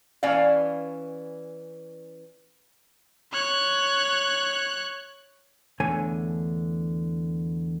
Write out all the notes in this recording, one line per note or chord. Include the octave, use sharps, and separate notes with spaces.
E3 C#4 D5 F5
C#5 F#6
E2 D3 A3 C#5 G#5